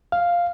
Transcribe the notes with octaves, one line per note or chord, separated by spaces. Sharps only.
F5